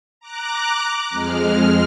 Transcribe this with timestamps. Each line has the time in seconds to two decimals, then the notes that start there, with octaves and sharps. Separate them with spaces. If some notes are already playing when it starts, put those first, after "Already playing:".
0.20 A#5 D6 F#6
1.10 F2 G#3 F6